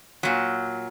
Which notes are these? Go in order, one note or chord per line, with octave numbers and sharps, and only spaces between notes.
A#2 F#3